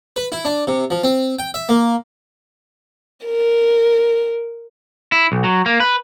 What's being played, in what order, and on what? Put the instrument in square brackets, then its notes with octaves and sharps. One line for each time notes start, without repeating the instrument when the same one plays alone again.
[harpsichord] B4
E4
D4
C3
F3
C4
G5
E5
A#3
[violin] A#4
[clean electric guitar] E4
B1
F#3
A#3
B4